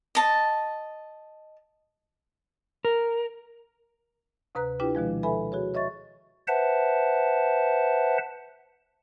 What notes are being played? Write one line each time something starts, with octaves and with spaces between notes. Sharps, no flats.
D#5 A5
A#4
D2 C3 B4 A#5 F#6
D4 E4 F4 G4 B4 G5
B2 D#3 F3 G#3
A4 B4 E5 G#5 B5
F#4 G#4 C#5
C#5 D#5 E5 C#6 A6
B4 C5 E5 F#5 A5